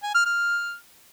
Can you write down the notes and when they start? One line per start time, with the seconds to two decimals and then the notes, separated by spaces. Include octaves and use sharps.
0.03 G#5
0.14 F6
0.26 F6